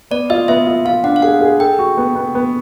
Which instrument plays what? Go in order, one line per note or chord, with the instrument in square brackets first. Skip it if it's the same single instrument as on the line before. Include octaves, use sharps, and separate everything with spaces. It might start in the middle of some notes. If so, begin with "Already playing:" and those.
[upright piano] B3 [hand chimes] D5
[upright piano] F4 [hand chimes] D#5
[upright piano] B3 [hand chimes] E5
[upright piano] F4
[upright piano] F4 [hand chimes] F5
[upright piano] D4 [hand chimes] F#5
[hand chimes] F5
[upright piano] G#4 [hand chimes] F#5
[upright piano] G#4
[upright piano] A4 [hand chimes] G5
[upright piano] F#4
B3
B3
B3